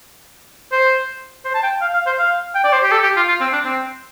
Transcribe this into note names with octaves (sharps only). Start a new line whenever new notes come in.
C5
C5
A5
G5
F5
F5
C5
F5
G5
D5
C5
G4
A4
G4
F4
F4
C4
D4
C4